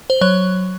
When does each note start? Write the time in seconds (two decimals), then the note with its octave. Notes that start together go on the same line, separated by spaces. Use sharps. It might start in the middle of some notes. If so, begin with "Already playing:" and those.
0.10 C5
0.21 F#3 C#5